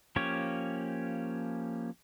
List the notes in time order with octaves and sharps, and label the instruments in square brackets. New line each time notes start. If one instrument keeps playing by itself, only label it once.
[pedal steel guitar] F3 A#3 C#4 G4 C#5